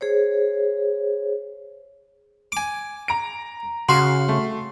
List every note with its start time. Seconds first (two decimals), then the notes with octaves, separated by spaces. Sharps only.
0.01 G#4 C5 C#5
2.52 G#5 D6
3.08 A#5 D7
3.89 C#3 F#4 F5 C6
4.28 A3